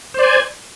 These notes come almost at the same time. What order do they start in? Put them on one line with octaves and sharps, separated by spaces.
C5 D5 G#5